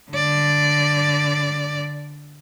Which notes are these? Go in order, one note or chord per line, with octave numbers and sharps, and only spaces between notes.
D3 D5